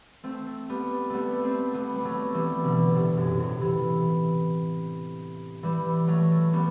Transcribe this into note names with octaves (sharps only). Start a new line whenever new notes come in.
A3 C4
G3 B3
G3 A3 B3
A3 C4
G3 B3
G3
F#3 A3
E3 G3
B2 D3
A2 C3
F#2 A2
A2 C3
C3 E3
E3 G3
F#3 A3
G3 B3